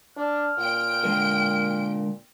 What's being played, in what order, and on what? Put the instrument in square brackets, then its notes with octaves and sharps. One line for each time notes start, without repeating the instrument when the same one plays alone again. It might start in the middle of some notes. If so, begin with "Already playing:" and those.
[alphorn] D4 [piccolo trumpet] F6
[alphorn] A#2 [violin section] G5 D7
[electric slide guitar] D3 G#3 A#4